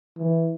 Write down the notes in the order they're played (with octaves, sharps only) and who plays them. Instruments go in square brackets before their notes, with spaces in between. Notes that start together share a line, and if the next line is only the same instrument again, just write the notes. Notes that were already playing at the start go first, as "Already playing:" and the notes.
[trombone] E3